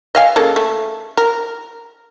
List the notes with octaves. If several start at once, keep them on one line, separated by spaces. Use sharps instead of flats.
D#5 F5 G#5
C#3 A#3 A4
A3
A#4